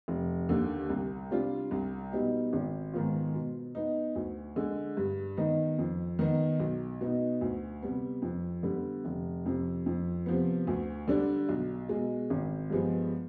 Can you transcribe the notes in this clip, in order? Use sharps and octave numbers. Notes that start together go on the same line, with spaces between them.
F1
D#2 D3
C2
C3 G3 D4 F4
C2
B2 G3 B3 D#4
G#1
G#2 D#3 B3 F4
B2
B3 D#4
D2
D3 G#3
G2
D#3 B3 D#4
F2
D#3 B3 D#4
B1
B2 B3 D#4
D2
C3 G3 B3
F2
D3 G3 B3
F1
F2 C3
F2
C3 F3 B3
D2
D3 G3 D4
B1
B2 G#3
G#1
G2 F3 G#3 B3